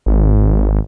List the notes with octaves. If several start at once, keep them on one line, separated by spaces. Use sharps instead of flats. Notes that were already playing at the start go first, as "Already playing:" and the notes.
G#1